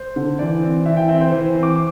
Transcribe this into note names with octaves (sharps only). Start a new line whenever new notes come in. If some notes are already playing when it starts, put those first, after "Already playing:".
Already playing: C5
D3
E3 D5
C4
E3 E5
G5
C4 E5
C5
E3 C5
C4
D6